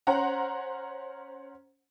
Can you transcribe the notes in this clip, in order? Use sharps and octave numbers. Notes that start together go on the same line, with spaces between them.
C#4 C5 F#5 A#5